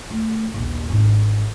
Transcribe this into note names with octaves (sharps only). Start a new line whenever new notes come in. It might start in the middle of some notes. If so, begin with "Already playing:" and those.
D3 A3
A#1 D#2
G#1 D3